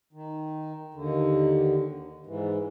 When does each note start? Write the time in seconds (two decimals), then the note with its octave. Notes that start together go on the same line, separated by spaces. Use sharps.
0.13 D#3
0.94 D#2 D3
2.26 G#2 E3